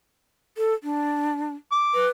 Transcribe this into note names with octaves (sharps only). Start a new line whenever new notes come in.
A4
D4
D6
B4